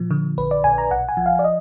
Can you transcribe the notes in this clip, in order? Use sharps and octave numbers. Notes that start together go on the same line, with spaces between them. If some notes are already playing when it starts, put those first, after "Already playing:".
Already playing: A#2 F3
D3
A#1 B4
D5
A#1 G#5
A#5
B1 F#5
G#5
F3
F5
D5
D#5